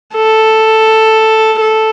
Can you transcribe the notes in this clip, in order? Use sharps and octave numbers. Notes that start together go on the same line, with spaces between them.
A4
A4